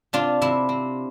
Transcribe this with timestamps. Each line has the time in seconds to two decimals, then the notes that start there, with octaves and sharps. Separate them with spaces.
0.13 C3 D4 F4
0.41 C3 E4
0.69 C4